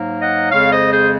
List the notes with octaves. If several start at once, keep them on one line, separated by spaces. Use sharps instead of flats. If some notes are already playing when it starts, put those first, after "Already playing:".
Already playing: G#2 F#3 A#3
D#5 F#5
F2 C#3 G#3 C#5 F5
C5 D#5
G#4 C5